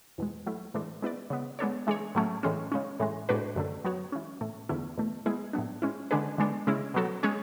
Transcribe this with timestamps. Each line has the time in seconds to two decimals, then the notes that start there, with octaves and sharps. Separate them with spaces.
0.18 E2 B2 G#3
0.46 F#3 A3 E4
0.74 A2 E3 G#3 D4 A4
1.02 G#3 B3 E4 B4 D5
1.30 C#3 G#3 B3
1.59 G#3 B3 D4 A4 C#5
1.87 E3 G#3 D4 G#4 C#5
2.15 A2 F#3 A3 C#4
2.43 A2 E3 G#3 C#4
2.72 C#3 G#3 C#4
3.00 A2 E3 G#3
3.29 A2 G#3 D4 F#4 B4
3.56 F#2 D3 A3
3.84 F#3 B3 F#4 C#5
4.12 E3 G#3 C#4
4.41 A2 E3 A3
4.69 E2 D3 A3 E4
4.98 E2 B2 A3
5.26 E3 G#3 B3 E4 G#4
5.53 A2 F#3 B3 D4
5.82 G#3 C#4 E4
6.11 D3 G#3 D4 G#4 B4
6.38 D3 G#3 B3 D4
6.67 C#3 G#3 C#4 E4
6.94 B2 F#3 B3 F#4 A4
7.23 G#3 C#4 G#4 C#5